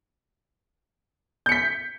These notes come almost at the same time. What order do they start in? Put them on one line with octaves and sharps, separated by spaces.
G6 C#7 B6